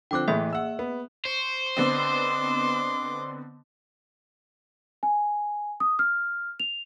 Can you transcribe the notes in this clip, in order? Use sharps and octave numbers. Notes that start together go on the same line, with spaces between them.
D3 F3 C4 G5 D6 F#6
A2 E3 A#3 G#4 E5
F#5 E6
B3
C5 C#6
D3 B3 C4 D#5 C6 D6
G#5
D#6
F6
F7